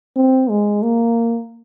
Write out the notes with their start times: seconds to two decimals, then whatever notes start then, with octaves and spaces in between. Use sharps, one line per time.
0.16 C4
0.49 G#3
0.82 A#3